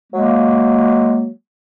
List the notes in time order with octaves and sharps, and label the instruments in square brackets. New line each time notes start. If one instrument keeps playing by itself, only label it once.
[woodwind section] F#3 G#3 A#3